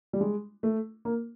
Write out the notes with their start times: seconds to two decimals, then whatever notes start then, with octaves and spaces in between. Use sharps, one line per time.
0.13 G3
0.21 G#3
0.63 A3
1.05 A#3